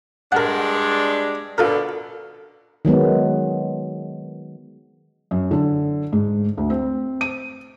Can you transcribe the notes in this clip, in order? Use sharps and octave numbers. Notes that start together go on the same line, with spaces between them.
G2 G#3 D4 A#4 F#5
B2 D3 F4 A4 A#4
D#3 F#3 G#3 B3
F#2
D3
G#2
D2
C4
D#7